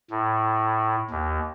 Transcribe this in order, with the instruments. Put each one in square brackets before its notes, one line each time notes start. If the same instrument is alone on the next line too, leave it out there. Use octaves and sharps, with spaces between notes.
[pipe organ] A2
D#2